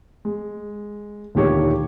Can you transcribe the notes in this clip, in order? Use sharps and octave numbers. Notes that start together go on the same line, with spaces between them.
G#3
D2 A#2 D#3 G4 C#5 C#6